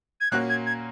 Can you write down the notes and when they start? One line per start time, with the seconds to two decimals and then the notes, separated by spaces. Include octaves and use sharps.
0.21 G#6
0.31 A#2 A#3 C#4 F#4 F#6
0.50 G#6
0.66 G#6